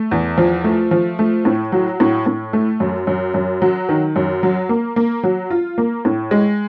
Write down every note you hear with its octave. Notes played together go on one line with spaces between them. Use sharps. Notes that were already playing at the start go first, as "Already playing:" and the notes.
Already playing: A3
E2
F3
A3
F3
A3
A2
F#3
A2
A2
A3
F#2
F#2
F#2
F#3
D#3
F#2
F#3
A#3
A#3
F#3
F4
A#3
A2
G#3